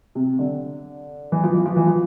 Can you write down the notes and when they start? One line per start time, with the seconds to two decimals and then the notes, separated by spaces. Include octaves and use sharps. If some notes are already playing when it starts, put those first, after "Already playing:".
0.15 C3
0.39 D3
1.32 E3
1.44 F3
1.54 E3
1.66 F3
1.76 E3
1.87 F3